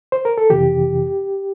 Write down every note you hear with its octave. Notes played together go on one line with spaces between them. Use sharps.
C5
A#4
A4
F2 C3 E3 G4